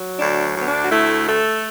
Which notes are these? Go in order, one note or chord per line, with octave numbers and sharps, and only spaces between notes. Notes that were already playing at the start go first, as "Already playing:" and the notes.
Already playing: F#3
D2 D4
D2
B3
D4
F#4
A3 E4
A3 A4